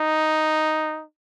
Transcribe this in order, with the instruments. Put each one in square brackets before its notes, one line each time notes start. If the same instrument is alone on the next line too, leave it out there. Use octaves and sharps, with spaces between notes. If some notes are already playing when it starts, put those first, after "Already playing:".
Already playing: [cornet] D#4